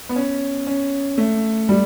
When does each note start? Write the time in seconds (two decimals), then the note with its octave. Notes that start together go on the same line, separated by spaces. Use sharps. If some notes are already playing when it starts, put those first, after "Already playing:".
0.09 B3
0.16 C#4
0.67 C#4
1.18 A3
1.69 G3